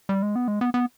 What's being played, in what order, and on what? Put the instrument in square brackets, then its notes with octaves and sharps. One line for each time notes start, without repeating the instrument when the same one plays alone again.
[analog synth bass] G3
G#3
B3
G#3
B3
B3